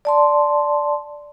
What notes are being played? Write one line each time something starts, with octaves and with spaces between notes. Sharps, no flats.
D5 A5 C6